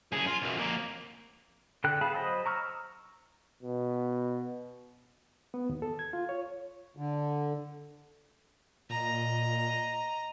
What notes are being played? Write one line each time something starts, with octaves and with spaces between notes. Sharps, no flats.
F#2 G#4
F4
B1 F#2
F2 A#3
D3 A4 G5 F#6
B3 G#4 F5 A5 B5
F#3 C5 D#5 B5 D#6
A#5 C#6 E6 F6
B2
B3
D#2
A4
G#6
F4
C#5
D3
A#2 D#5 A#5